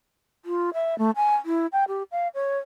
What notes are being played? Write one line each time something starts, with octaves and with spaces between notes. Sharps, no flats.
F4
E5
A3
G#5
E4
G5
G4
F5
C#5